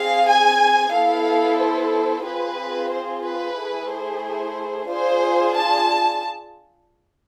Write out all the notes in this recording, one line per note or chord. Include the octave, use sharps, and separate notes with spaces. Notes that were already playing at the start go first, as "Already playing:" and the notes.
Already playing: C4 G#4 F5
G#5
B3 E4 A4 F5
C5
C4 F4 G#4 B4
C5
B4
A3 E4 G#4
C5
D4 F4 G#4 C5
A5